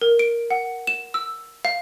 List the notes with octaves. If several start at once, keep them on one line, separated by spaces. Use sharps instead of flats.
A#4
D7
F#5
E7
E6
F5